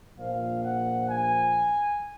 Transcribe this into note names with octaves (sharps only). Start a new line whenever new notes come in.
A#1 A#2 F3 F5
F#5
G#5